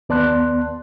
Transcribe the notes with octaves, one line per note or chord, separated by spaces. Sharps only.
D#2 B3 D5 A5 C6 F#6